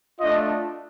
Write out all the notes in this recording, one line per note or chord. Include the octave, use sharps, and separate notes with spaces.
A3 D4 F4 D#5